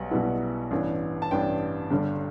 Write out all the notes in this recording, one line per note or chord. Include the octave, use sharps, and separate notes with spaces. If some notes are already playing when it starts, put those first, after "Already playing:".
Already playing: B1 B2 G3 B3 F#5
B1 B2 G3 B3 E4
A1 G2 E3 B3 D4
A5
A1 G2 E3 B3 D4 G5
G1 G2 D3 G3